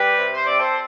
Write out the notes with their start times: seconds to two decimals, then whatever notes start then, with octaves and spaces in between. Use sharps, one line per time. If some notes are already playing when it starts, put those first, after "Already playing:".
Already playing: G3 G4 B4
0.18 C3
0.33 C5
0.45 C4 D5
0.59 A4 C5